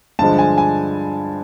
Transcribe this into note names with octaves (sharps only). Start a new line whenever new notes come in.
G2 D3 F3 G#3 A5
G#5
G#5